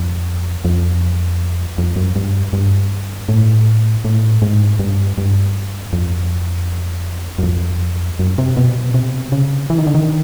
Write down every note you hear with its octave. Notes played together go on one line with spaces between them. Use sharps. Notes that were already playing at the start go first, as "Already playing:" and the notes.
Already playing: F2
F2
F2
F#2
G2
G2
A2
A2
G#2
G2
G2
F2
F#2
F2
F#2
C3
B2
C3
C#3
E3
D#3
D3
D#3